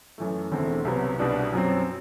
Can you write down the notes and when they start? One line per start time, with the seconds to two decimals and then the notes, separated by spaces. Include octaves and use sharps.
0.18 F#2 E3 A3
0.52 E1 E2 D3 A3 C4
0.85 C2 C3 F#3 B3
1.19 C2 B2 G3 D4 F#4
1.53 F#2 F#3 C4